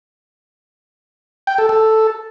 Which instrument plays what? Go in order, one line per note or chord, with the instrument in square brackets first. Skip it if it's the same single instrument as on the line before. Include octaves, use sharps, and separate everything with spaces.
[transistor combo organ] G5
A4
A4